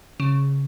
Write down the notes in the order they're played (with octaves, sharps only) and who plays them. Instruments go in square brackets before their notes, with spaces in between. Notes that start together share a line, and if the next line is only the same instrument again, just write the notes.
[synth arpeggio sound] C#3